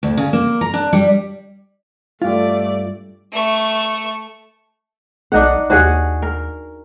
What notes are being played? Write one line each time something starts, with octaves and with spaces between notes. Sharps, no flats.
D2
C#3
A#3
A#5
D4
G3
G2 A3 F4 D5
A3 C#6
B1 D4 D#4 F#5
D#2 F#4 G#4 F#5
A#4